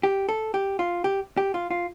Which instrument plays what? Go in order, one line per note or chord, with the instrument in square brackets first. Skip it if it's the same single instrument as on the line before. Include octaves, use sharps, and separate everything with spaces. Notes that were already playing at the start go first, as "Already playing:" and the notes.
[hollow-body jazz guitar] G4
A4
G4
F4
G4
G4
F4
F4